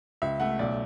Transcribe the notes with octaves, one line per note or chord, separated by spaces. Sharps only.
C#2 E5
A3 F#5
B1 D5